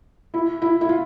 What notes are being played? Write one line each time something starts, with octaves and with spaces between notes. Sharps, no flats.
E4
E4
E4
F4